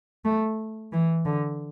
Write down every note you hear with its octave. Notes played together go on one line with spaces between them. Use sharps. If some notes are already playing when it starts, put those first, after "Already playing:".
A3
E3
D3